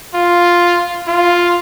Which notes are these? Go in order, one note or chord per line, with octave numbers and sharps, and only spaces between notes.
F4
F4